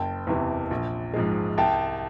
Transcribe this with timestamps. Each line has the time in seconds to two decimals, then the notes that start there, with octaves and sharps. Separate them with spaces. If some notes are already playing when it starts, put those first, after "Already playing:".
Already playing: F#1 G5 A5
0.27 E2 C3 E3
0.71 A#1
1.14 G#2 F3 G#3
1.58 C2 G5 A5